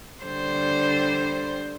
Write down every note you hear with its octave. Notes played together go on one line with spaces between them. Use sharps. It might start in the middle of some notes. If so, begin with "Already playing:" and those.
D3 G3 C5